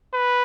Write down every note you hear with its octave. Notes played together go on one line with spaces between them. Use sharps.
B4